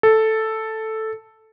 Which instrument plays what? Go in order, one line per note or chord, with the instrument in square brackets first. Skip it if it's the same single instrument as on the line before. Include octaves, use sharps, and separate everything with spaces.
[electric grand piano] A4